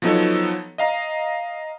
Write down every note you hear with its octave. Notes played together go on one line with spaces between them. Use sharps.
F3 F#3 B3 D#4 A4 C#5
D#5 F5 A#5